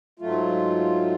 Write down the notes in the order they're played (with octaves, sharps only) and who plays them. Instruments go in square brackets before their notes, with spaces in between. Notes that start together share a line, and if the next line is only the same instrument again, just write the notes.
[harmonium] G#2 F#3 A3 F4